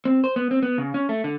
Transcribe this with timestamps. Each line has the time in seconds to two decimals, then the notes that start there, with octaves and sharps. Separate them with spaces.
0.05 C4
0.24 C5
0.36 B3
0.51 C4
0.63 B3
0.78 C#3
0.94 C#4
1.09 A3
1.24 D3